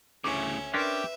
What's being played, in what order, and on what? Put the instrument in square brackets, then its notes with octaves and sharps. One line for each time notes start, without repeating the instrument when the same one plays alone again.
[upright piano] D2 C#6 D6 [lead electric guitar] A2 C#3 [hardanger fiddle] C#4 E5
[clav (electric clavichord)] C#4 D4 A#4 [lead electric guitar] G4 [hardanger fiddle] B4 E5 [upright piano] C6